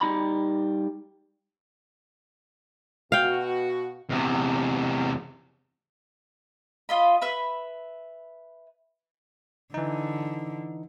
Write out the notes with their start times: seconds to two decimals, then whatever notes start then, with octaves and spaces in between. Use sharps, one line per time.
0.01 G3 D#4 A#5 B5
3.12 B2 F#4 F5 G5
4.09 E2 C3
6.89 F4 D#5 B5
7.22 B4 E5 B5
9.74 D3 E3 D#4